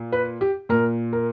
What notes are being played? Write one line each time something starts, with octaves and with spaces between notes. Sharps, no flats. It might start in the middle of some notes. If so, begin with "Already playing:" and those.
Already playing: A#2
B4
G4
A#2 A#4
A#4